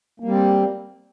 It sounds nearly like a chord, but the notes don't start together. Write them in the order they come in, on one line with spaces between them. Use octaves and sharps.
A#3 G3 C4